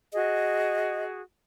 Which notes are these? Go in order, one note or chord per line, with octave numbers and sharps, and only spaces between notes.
F#4 G#4 D#5